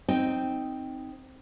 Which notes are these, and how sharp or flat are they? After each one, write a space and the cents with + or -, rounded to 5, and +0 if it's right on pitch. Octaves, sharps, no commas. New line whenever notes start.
C4 +0 D#4 +0 G5 +0